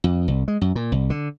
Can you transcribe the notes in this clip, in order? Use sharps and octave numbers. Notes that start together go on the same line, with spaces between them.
F2
C2
G#3
F#2
A#2
C2
D3